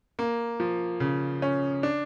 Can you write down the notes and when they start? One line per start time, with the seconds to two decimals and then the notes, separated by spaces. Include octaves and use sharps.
0.19 A#3
0.60 F3
1.00 C#3
1.42 C#4
1.83 D4